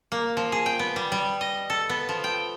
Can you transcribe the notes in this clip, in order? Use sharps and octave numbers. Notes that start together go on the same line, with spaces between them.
A#3
F3
G#4
G5
B3
G3
G3
D#5
A4
B3
F3
G5